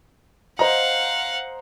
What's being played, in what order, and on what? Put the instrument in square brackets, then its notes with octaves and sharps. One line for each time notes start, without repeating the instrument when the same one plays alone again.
[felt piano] C5 D#5 A#5 [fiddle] F5 F#5